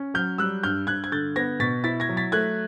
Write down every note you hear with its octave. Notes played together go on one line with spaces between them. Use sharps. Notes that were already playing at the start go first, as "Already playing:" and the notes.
Already playing: C#4
F#3 F6 G6
G3 E6 F#6
G2 F6 G6
G2 F#6 G#6
G#6
D3 G6 A6
B3 G#6 A#6
B2 A6 B6
E4 A6 B6
G#6 A#6
F#3
A6 B6
A3 F#6 G#6